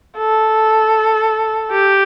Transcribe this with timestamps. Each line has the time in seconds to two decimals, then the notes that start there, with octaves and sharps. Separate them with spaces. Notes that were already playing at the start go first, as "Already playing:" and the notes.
0.18 A4
1.72 G4